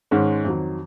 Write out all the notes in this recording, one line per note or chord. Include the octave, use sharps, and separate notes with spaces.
G#2 D#3 G#3 C#4
F2 D#3 F#3